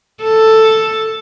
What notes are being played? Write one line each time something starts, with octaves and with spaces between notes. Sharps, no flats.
A4